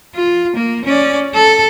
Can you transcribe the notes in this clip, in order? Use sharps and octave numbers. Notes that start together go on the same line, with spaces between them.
F4
A#3
C#4 D5
A4